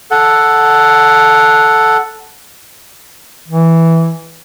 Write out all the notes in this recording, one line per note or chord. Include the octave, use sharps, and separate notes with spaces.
A4 F#5
E3